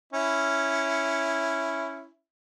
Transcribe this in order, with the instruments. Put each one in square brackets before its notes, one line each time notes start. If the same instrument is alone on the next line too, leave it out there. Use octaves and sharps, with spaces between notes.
[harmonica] C#4 E4